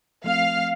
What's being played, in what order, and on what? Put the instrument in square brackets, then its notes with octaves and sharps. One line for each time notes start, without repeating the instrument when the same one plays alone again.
[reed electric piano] F3 A3 C4 [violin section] F5